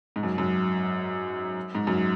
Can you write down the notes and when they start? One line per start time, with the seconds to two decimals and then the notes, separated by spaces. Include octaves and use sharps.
0.16 G#2
0.23 F#2
0.38 F#2
1.75 G#2
1.87 F#2